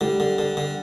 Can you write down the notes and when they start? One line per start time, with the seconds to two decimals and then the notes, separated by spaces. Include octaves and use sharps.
0.01 D3 G3 G4
0.20 D3
0.39 D3
0.57 D3